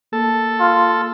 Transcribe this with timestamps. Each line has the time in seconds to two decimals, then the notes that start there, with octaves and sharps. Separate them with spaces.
0.13 A#3 A4
0.60 F4